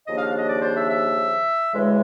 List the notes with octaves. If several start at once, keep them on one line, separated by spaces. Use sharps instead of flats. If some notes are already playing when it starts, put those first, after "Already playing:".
D#2 C#3 F3 A#3 D4 D#5
F5
F5
D#5
D5
C5
E5
E5
D2 C#3 E3 G#3